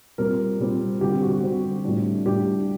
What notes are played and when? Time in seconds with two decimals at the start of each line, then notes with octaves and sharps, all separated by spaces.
0.18 A#2 G3 C4 A#4
0.60 A#2 G3 C4
1.01 D3 G3 C4 G4
1.22 F#4
1.32 F#4
1.43 D3 G3 C4
1.84 A2 G3 D4
2.26 A2 G3 D4 G4